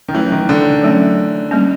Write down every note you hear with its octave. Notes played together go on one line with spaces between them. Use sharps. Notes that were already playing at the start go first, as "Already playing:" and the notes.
D#3
E3 F#3 A3 C#4
D#3
D3
F#3 A3 C#4
G3 A#3 C#4